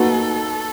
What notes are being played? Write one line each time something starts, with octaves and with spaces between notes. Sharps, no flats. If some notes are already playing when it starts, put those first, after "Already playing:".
Already playing: A#3 D#4 F#4 A4 B4